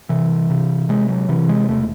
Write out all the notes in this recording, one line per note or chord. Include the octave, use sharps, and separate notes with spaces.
C3 E3
C3
C3 G#3
F#3
C3 E3
G#3
E1 A3